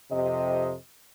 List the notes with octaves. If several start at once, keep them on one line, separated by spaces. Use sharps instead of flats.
F2 C3 D#5